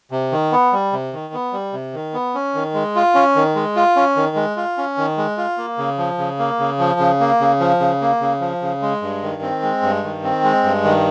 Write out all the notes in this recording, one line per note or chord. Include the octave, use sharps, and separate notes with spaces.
C3
D#3
B3
G3
C3
D#3
B3
G3
C3
D#3
B3
C#4
D#3
G#3
F4
C#4
D#3
G#3
F4
C#4
D#3
G#3
F4
C#4
D#3
G#3
F4
A#3
C#3
F3
C#3
A#3
C#3
F3
C#3
A#3
C#3
F3
C#3
A#3
C#3
F3
C#3
G#3
G2
D#3
C4
G#3
G2
D#3
C4
G#3
G2
D#3